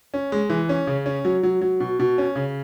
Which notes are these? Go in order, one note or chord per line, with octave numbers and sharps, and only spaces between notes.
C#4
G#3
E3
C#4
C#3
C#4
F#3
F#3
F#3
B2
B2
C#4
C#3